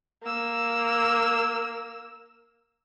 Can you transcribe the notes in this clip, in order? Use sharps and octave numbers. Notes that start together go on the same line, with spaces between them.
A#3 E6